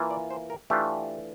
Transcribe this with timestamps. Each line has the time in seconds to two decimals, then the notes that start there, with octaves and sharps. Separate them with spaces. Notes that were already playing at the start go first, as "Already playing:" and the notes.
Already playing: E3 A#3 F4
0.11 D5
0.30 C5
0.50 A#4
0.70 E3 A3 D4 F4 G4